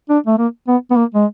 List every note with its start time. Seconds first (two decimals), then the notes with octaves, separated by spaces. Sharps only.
0.09 D4
0.27 A3
0.38 A#3
0.68 B3
0.91 B3
0.96 A#3
1.15 G#3